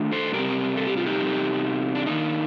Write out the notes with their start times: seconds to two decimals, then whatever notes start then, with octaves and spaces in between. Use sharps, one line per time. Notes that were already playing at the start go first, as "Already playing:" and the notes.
Already playing: D#3 A3 D4
0.12 A4 C5
0.34 C3 G3 C4 G4 A#4
0.77 A4
0.87 G4
0.97 F4
1.06 D#4 G4
1.21 C3 G3 C4
1.95 D4
2.06 D#3 A#3 D4 D#4